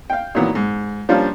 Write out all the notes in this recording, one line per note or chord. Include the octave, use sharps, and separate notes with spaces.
F5 G5
A#2 D#3 E3 F#3 A#3 B3
G#2
F3 G3 A#3 C#4 D4 F4